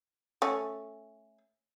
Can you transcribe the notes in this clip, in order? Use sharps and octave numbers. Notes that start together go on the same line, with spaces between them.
A3 C#4